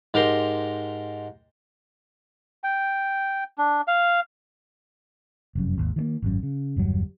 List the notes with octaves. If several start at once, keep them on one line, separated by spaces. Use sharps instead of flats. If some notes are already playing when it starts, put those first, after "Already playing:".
G#2 G4 A#4 A#5 C6
G5
D4
F5
F1 F#2
G#1 D#2
D#3 F#3 A#3
G#1 F#2
C#3
G1 E2 G2 F#3